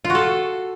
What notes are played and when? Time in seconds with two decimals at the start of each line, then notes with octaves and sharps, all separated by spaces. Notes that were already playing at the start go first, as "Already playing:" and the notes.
0.05 F4
0.10 F#4
0.15 A4